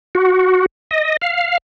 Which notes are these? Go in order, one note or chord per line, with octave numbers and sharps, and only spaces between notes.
F#4
D#5
F5